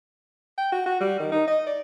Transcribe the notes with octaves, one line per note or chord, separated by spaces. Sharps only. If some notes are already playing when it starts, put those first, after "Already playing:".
G5
F#4
F#4
G3
D#3
D#4
D#5
D5